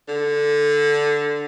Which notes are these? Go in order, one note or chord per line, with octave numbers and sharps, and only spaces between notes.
D3